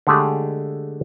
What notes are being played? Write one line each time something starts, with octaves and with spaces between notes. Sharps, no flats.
D3 G#3 A3 G4 G#4